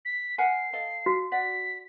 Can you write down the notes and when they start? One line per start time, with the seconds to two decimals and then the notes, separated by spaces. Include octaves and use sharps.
0.05 B6
0.38 A#4 F#5 G#5 C7
0.73 A4 D#5 F5
1.06 F#4
1.32 D5 F#5 B6